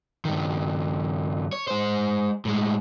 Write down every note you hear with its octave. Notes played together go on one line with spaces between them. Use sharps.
G2 D#3
C#5
G#3 C5
A2 G#3